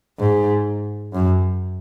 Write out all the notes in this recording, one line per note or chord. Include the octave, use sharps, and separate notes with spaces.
G#2
F#2